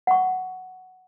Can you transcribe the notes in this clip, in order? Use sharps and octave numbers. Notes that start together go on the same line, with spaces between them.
F#5 C#6